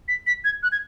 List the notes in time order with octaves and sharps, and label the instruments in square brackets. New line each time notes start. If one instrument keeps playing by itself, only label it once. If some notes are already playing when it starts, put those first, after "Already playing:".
[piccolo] B6
B6
G#6
F#6
G#6